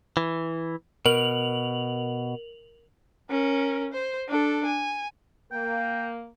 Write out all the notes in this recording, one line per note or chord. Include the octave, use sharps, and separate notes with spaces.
E3
B2 A#4 F7 F#7
C#4 A#4
C5
D4 A4
G#5
A#3 G5